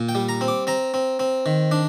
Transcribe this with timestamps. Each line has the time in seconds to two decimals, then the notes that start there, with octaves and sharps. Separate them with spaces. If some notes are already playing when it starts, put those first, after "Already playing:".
Already playing: A#2
0.09 G5
0.15 G3
0.29 A#5
0.41 C4
0.48 D6
0.67 C4 A#5
0.94 C4
1.19 C4
1.46 D#3
1.71 D4